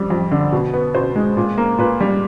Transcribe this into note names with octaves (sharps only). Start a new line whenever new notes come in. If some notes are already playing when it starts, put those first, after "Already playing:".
Already playing: F2 G3
F2
D3
B2
B3
B2 C5
G#3
A#2
A#3
A#2 B4
G3